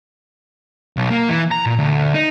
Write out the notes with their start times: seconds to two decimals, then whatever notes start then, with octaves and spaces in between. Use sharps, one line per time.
0.97 B1
1.11 A#3
1.29 E3
1.51 A#5
1.66 A#2
1.79 D2
2.14 D#4